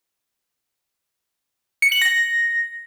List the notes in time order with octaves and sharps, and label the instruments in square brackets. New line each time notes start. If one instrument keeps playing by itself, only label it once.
[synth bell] C#7
F#7
A#6